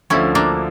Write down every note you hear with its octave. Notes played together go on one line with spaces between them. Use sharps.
D2 D3 F3 C#4 E4
A#3 D4